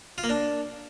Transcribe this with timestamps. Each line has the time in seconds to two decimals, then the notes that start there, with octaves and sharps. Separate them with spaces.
0.18 F4
0.24 A#3
0.29 D4